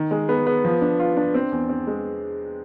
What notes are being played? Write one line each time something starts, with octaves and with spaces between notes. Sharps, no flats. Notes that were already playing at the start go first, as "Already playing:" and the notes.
Already playing: D#3
G#3
B3
B3
F3
D4
F4
D4
C4
E2
C4
G#3